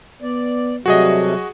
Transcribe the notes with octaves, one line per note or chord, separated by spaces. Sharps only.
B3 D5
C3 F#3 G3 A3 F#4 G#4 D#5